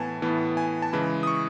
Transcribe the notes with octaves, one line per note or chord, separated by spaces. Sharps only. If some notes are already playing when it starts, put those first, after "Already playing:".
Already playing: A2 E3 B3 G#5 A5
A2 E3 B3
G#5
A5
C#3 E3 G#3 B5
D#6
C#6